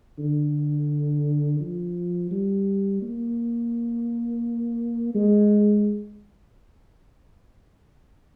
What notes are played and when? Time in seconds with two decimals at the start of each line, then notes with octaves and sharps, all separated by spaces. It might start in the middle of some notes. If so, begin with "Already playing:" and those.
0.19 D3
1.60 F3
2.31 G3
3.02 A#3
5.15 G#3